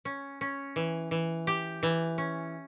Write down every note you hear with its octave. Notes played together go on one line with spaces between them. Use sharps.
C#4
C#4
E3
E3
G4
E3
C#4